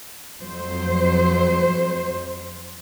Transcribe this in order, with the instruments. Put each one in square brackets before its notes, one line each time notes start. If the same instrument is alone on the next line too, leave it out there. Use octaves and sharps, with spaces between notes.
[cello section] F2 F#3 C5